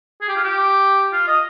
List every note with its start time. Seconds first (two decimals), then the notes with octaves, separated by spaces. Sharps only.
0.21 G#4
0.29 G4
0.36 F4
0.43 G4
1.13 F4
1.28 D#5